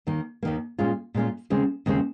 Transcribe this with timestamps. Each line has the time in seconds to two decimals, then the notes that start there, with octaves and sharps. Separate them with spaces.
0.07 D#2 D#3 A#3
0.43 D#2 D#3 A#3
0.79 A#2 G#3 C#4 F4
1.14 A#2 G#3 C#4 F4
1.50 D#2 C#3 G#3 C4
1.86 D#2 C#3 G#3 C4